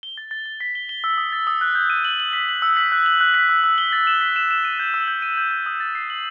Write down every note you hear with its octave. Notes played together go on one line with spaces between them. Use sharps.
G7
A6
A6
A6
B6
G7
G7
E6
D#6
A6
D#6
F#6
G6
D#7
F#7
F#7
B6
F#7
E6
B6
F#6
F#7
F#6
B6
E6
E6
G7
A6
E7
B6
E7
E7
D#7
G6
E6
G6
D#7
G6
G6
D#6
A6
C7
F#7